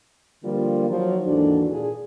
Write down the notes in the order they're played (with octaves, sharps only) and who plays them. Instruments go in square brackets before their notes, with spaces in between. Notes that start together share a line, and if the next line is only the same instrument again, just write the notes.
[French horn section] D3 F3 G3 A#3 F4
D#3 F3 F#3
D#2 G#2 E3 D4 F#4 A4
A#2 G#4